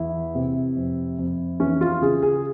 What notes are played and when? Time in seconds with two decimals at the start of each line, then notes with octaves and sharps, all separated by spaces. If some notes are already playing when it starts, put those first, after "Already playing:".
Already playing: E2 E3 E4
0.35 C3
0.77 F2
1.19 F2
1.60 E3 C#4
1.81 F4
2.02 C#3 G#4
2.22 G#4